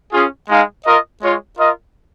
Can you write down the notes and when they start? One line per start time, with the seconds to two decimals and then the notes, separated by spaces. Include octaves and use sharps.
0.13 C#4 F4 G#4
0.49 G#3 D#4 G#4 F5
0.86 F4 A#4 D#5
1.22 G#3 F4 C#5
1.58 F4 A#4 D#5